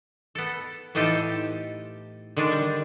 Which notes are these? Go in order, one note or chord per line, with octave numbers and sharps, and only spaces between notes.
B3 A4
A2 E3 D#4 F4 G4 A4
D3 D#3 G#3 D4
G3